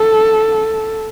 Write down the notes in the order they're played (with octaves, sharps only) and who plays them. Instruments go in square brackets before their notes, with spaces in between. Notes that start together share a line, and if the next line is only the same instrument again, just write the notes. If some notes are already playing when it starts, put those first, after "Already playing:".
Already playing: [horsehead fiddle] A4